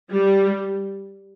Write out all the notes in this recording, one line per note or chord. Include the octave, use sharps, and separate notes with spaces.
G3